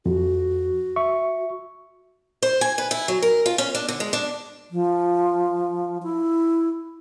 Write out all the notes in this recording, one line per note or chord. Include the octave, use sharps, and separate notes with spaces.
F2 F#4
E5 C#6
C5
G#5
B4
E4
F#3
A#4
F4
C#4
D4
D3
G#3
D4
F3
E4